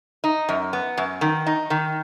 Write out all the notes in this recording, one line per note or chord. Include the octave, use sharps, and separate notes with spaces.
D#4
F#2
B3
F#2
D#3
D#4
D#3